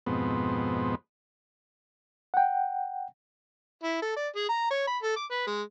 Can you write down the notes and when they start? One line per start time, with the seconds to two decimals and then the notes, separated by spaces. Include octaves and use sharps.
0.07 F2 G#2 B2 B3 C4
2.34 F#5 G5
3.84 E4
4.02 A4
4.16 D5
4.35 G#4
4.49 A#5
4.71 C#5
4.87 B5
5.03 A4
5.16 D6
5.31 B4
5.47 G#3